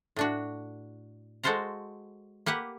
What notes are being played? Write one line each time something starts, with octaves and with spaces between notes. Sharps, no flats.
A2 D4 F#4
G#3 F#4 A4 C5 F5 A#5
A#3 G4 B4 F#5